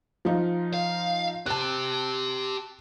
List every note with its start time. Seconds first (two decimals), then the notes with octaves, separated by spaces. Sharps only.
0.25 F3 D#4 F4
0.74 F5
1.46 G4 C5 A5 F#6